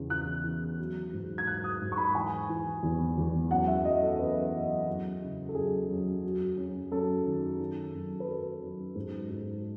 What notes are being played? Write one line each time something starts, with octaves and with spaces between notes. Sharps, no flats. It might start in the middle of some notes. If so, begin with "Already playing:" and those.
Already playing: E2 C#3
E3 F#6
E3
F#3
G#2
G#6
F#3 F#6
D#6
G#2
C#6
B5
E3 G#5
E3
E2
E2
F#2 F#5
E5
F#2 D#5
A4
F#2 B4
F#2
F#2
C#3
A4
F#2 G#4
F#2
F#3
F#2
F#2 A4
D#3
D#3
F#2
B4
F#3 A4
F#2
G#2
G#2